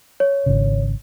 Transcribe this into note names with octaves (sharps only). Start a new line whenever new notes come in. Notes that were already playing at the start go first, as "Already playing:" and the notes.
C#5
G#1 C#3